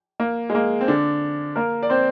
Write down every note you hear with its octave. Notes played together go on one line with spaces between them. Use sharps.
A#3
G#3
A#3
C4
D3 D4
A#3 A#4
D5
C4 C5